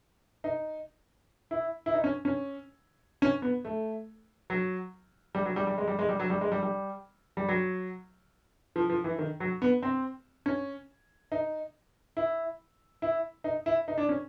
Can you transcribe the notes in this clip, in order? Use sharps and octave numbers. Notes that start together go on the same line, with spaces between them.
D#4
E4
E4
D#4
C#4
C#4
C#4
B3
A3
F#3
G3
F#3
G3
G3
G#3
G3
G#3
G3
F#3
G3
G#3
G3
G3
G3
F#3
F3
F3
E3
D#3
F#3
B3
C4
C#4
D#4
E4
E4
D#4
E4
D#4
D4
C#4